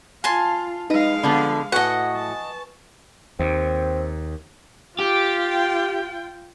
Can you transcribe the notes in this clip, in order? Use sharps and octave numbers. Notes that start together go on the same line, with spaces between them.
F4 F5 G#5 A5 C6
G#3 D#4 B4 D#5 F5
D3 F3 B3 F#5 B5
A2 F#4 B4 D#5 F#5 G#5 C#6
A5
D#2 C4
F4 G4 G5